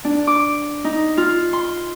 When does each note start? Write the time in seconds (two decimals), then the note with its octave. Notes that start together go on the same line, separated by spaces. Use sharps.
0.05 D4
0.27 D6
0.84 D#4
1.17 F4
1.53 C6